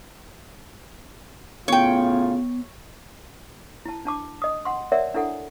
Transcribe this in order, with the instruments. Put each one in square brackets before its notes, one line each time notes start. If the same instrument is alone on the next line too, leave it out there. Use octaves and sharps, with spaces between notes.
[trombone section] A2 C#3 F4 [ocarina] B3 [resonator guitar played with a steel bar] C#5 G5
[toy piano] E4 A5
D4 A5 D6
D#5 D#6
F#5 C6
A#4 C#5 D5 E5 F#5 G#5
D4 E4 A4 F#5 G#5